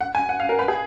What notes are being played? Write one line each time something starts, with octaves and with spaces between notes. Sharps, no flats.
F#5
G#5
F#5
F5
A#4
B4
G#4